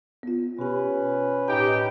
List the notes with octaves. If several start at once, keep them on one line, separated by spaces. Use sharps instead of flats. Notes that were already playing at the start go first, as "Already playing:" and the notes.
B3 F4
B2 C#4 G4 B4
A2 D#4 G4 G5 A#5